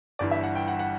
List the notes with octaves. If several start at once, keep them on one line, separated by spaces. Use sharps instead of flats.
G1 G2 E3 D5
E5
F#5
G5
F#5
F#5